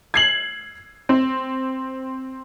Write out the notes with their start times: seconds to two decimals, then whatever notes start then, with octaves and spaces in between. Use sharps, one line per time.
0.14 G#6 C7 F#7
1.09 C4